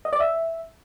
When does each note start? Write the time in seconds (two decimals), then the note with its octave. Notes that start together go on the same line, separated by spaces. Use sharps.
0.05 D#5
0.13 D5
0.20 E5